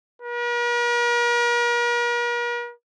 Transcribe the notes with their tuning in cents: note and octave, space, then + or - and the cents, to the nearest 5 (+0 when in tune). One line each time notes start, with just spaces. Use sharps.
A#4 +45